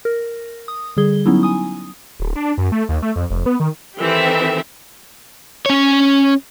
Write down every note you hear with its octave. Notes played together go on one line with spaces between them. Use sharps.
A#4
D#6
D3 G3 G#4 G7
F#3 B3 C#4 D#4 E4
G#5 D#6
D1
D4
F#2
A3
D#2
A3
F2
F1
B3
D#3
D#3 E3 C4 G4 A4 E5
C#4 C#5